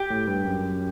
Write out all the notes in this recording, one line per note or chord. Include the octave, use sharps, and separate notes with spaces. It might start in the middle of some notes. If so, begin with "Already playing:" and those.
Already playing: G4
A2
G2
F#2